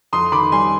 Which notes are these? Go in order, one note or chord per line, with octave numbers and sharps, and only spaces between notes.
F2 C6 D#6
D#3 B5 D6
G3 G#5 C6